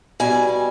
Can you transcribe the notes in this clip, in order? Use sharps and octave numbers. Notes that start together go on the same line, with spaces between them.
B2 G3 G#5